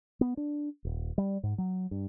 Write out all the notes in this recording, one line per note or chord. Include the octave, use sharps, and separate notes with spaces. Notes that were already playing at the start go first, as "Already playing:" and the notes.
B3
D4
D#1
G3
G#2
F#3
G2